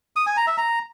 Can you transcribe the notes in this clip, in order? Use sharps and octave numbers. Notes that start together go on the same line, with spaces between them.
D#6
G#5
A#5
E5
A#5